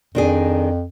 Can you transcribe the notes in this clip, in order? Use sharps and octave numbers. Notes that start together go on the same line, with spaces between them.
F2 D#3 D4 G#4